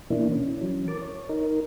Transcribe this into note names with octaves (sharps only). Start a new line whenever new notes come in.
B2 E3 A#3 D4 E4
C#4
E3 F#3 C#4
A#4 A5 D6
C#5
D#4 A#4